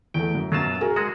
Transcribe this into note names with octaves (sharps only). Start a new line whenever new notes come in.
E2 A3 G5
F#2
F#2 B2 F#3 F4 A5
F#4 G#4 A#4
G#3 F#4 D#6